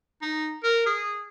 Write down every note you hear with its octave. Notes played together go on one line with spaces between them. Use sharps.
D#4
A#4
G#4